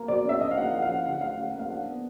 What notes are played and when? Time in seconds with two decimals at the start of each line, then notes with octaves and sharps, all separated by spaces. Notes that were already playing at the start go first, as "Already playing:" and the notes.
Already playing: A#3
0.08 B2 D5
0.25 C#4 E5
0.41 D4 D#5
0.51 F5
0.57 A#3 F#5
0.73 F3 F#5
0.82 F5
0.89 C#4 F#5
1.06 D3 F#5
1.21 A3 F5
1.37 C#4 F#5
1.48 A#3 F#5
1.59 F5
1.70 D4 F#5
1.86 B3